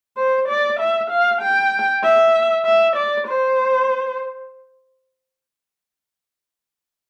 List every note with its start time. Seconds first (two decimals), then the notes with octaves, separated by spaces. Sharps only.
0.17 C5
0.48 D5
0.80 E5
1.10 F5
1.42 G5
2.04 E5
2.65 E5
2.96 D5
3.27 C5